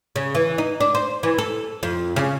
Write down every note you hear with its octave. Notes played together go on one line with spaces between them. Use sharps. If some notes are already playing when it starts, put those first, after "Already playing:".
C#3
E3
D#4
D4
C5
E3
A4
F2
C#3